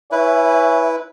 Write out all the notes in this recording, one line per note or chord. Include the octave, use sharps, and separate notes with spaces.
E4 B4 C#5 E5 G#5